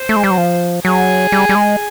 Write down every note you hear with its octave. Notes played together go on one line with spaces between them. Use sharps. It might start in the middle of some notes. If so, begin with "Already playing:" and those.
Already playing: C5
A3
G#3
G3
F#3
F3
F#3 G#4
G3
G3
G#3